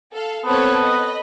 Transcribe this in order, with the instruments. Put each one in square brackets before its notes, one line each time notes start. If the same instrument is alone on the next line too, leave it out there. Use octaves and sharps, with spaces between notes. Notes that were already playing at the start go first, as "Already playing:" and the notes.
[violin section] A4 F5
[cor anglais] B3 [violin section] C4 A4 C#5
[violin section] D#5 B5